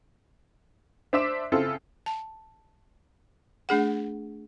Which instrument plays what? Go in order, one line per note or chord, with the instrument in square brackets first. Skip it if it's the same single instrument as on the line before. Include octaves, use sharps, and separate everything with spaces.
[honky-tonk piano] D4 C5 E5 D6 E7
C#3 C4 E4 F4 A4
[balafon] A5
A3 D4 G#4 F#5